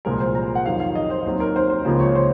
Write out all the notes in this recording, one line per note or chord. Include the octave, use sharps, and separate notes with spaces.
C2 A#2 F3 G#3 A#4
C5
A#5
F#5
F2 D#3 F#3 F5
F5
D#5
C5
D#2 D#3 F#3 C4 C5
A#4
C5
C5
C#2 C#3 F3 A#3 C5
C#5
C5